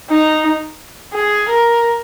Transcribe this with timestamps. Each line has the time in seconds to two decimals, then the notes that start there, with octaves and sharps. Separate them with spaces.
0.09 D#4
1.13 G#4
1.48 A#4